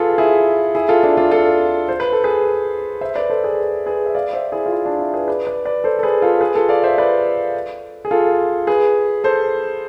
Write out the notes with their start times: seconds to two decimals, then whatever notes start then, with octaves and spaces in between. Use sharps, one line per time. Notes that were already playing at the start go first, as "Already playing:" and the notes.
Already playing: F4 G#4 A4 B4
0.18 E4 G#4
0.75 E4 G#4
0.89 F4 A4
1.03 D4 F4
1.17 D4 F4
1.31 F4 A4
1.88 C5
2.00 B4
2.12 A4
2.24 G#4 B4
3.01 C5 E5
3.15 B4 D5
3.30 A4 C5
3.44 G#4 B4
3.86 G#4 B4
4.06 E5
4.15 D5 F5
4.33 C5 E5
4.52 E4 G#4
4.66 F4
4.71 E4
4.85 D4
4.99 E4
5.14 G#4 B4
5.28 B4 D5
5.47 B4 D5
5.65 B4 D5
5.84 A4 C5
5.99 A4
6.03 G#4 B4
6.22 F4 A4
6.41 G#4 B4
6.55 F4 A4
6.69 D5 F5
6.83 C5 E5
6.98 B4 D5
8.05 G#4
8.11 F4 A4
8.67 G#4 B4
9.24 A4 C5